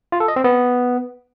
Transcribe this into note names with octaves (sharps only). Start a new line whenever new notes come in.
F4
A4
D#5
C4
B3